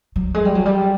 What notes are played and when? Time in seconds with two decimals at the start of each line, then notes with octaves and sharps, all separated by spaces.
0.16 F#3
0.34 G#3
0.45 G3
0.55 F#3
0.66 G3